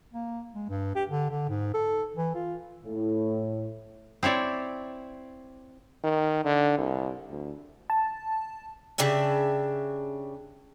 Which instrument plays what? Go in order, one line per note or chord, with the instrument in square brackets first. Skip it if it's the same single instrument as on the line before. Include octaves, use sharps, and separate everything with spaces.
[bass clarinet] A#3
G#3
G2
G4
D3
D3
G#2
A4
E3
F4
[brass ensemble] A2
[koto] C4 E4 C#5 D5
[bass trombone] D#3
D3
C2
D2
[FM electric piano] A5
[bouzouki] C#3 D4 G4 E5